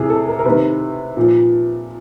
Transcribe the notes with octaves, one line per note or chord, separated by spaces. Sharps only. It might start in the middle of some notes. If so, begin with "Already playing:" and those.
Already playing: C3 E3 E4 G#4
A4
A#4
A#4
C3 D#3 B4
A#2 F3